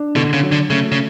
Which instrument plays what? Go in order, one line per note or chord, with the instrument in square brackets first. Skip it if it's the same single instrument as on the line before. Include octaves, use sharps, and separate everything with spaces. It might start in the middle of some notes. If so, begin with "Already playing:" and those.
Already playing: [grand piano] D4
[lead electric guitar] B2 [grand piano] D3
[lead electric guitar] C#3
[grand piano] F#3
[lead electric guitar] D3
[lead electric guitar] C#3 [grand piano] A3
[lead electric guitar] C#3